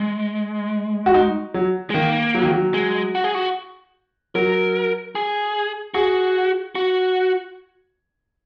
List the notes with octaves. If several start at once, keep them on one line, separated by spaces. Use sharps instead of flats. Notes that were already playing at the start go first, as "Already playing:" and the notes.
Already playing: G#3
F#4
D#4
F#3
G#3
D#3 A#3
F#3
D#3
F#3
G#3
F#4
G#4
F#4
F#3 A#4
G#4
F#4 G#4
F#4